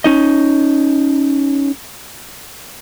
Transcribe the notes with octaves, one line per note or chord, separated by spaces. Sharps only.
C#4 D#4 D#5